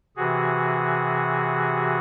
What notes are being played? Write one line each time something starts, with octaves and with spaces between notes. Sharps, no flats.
C3 E3 F#4 G#4